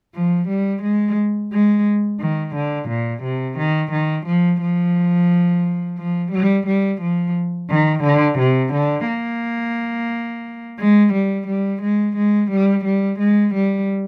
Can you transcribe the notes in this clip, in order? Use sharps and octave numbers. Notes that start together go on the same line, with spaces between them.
F3
G3
G#3
G#3
D#3
D3
A#2
C3
D#3
D#3
F3
F3
F3
G3
G3
F3
D#3
D3
C3
D3
A#3
G#3
G3
G3
G#3
G#3
G3
G3
G#3
G3